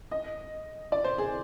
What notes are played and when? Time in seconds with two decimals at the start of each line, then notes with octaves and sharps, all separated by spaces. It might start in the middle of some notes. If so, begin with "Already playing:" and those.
0.11 D#5
0.92 D5
1.04 C5
1.18 G#4